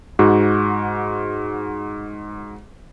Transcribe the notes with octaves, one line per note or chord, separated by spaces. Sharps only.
G#2 F#4